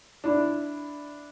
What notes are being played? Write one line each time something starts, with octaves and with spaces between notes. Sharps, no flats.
D4 E4